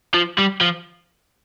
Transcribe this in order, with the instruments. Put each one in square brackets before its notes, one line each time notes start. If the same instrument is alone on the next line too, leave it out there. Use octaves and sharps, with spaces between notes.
[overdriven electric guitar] F3
G3
F3